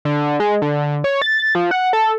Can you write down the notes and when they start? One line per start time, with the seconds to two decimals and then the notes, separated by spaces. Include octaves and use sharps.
0.05 D3
0.40 G#3
0.62 D3
1.04 C#5
1.22 A6
1.55 F3
1.71 F#5
1.93 A4